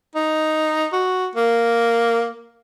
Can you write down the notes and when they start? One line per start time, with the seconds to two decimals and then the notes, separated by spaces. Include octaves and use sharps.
0.15 D#4
0.93 F#4
1.35 A#3